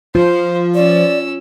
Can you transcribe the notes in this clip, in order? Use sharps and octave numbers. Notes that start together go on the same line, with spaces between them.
F3 F4 C5
C#4 D5 E6